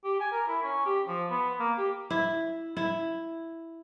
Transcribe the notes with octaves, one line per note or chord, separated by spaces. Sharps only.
G4
G#5
A#4
E4
C#4
G4
F3
B3
A#3
G4
E4
E4